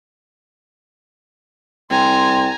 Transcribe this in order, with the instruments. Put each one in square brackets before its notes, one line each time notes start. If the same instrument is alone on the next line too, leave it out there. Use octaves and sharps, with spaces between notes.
[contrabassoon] C2 [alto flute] G5 [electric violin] G#5 A#5 [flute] C6